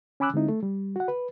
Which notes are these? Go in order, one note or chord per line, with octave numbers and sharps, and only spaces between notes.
C#4 G#5 B5 D6 E6 F#6
D3 G#3 C4 D#4 E4
A3
G3
F#4 F#5
B4